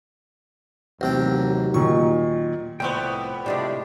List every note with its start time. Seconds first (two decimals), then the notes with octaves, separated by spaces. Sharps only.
1.01 A1 D#2 C3 F#3 G5
1.74 A#2 D#3 C#6
2.80 C2 F2 A2 B3 C5 G5 C#6
3.46 A2 C3 G3 G#3 D4 D5